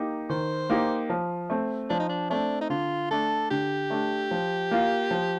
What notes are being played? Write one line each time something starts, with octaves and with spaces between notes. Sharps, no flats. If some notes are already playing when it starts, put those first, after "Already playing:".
Already playing: A#3 D#4 G4
D#3 C5
A#3 D#4 G4
F3
A3 C4
F3 D4
D#4
D4
A3 C4 D4
D#4
D3 F4
A3 D4 A4
D3 G4
A3 D4
F3
A#3 F4
F3